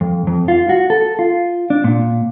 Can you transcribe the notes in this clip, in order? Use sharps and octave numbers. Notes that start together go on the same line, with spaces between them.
F2
F2
F4
F#4
A4
F4
D4
A#2